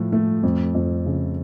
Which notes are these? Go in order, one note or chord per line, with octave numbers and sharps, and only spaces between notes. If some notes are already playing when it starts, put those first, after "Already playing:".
Already playing: A2 F3 A3
A3
F2
F2
C#3